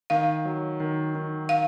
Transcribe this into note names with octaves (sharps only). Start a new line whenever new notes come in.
D#3 F5
F#3
D#3
D#3
F5